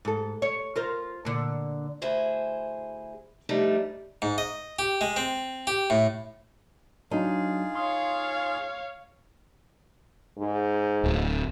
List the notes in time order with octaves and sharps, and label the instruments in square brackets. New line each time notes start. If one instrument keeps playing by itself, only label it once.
[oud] G#2 A4
C#5
F4 A#4 C5
A#2 D3
[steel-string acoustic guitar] D2 E4 G#4 C5
F3 G3 A3 D4 D#4
[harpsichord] G#2
D#5
G4
G#3
C4
G4
A2
[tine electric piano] F#3 D4 [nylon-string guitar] D#4 [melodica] F4 G#4
[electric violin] C#5 F5 [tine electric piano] C6 D#6
[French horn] G#2
[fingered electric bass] D1